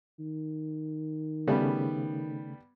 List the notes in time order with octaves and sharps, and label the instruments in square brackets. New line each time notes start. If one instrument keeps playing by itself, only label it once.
[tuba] D#3
[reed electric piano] C#3 A3 [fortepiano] G3 B3